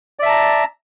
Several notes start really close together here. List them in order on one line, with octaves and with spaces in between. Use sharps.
D5 E5 A5 A#5